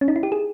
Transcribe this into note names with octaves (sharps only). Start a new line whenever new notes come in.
C#4
D#4
E4
G4
G#4